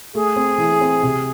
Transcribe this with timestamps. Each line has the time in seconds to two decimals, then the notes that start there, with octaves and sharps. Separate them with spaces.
0.15 A3 G#4
0.36 C4
0.58 E3
0.81 C4
1.03 C3